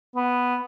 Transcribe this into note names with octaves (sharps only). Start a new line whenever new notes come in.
B3